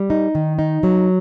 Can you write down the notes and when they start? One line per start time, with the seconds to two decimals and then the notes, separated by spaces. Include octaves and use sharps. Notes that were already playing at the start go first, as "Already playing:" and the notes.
Already playing: G3
0.10 D#4
0.35 D#3
0.59 D#4
0.83 F#3